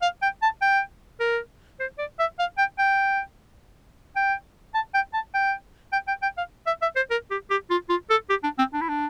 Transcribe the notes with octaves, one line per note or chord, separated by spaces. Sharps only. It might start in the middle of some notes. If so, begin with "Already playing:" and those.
F5
G5
A5
G5
A#4
C5
D5
E5
F5
G5
G5
G5
A5
G5
A5
G5
G5
G5
G5
F5
E5
E5
C5
A#4
G4
G4
F4
F4
A4
G4
D4
C4
D4
E4
D4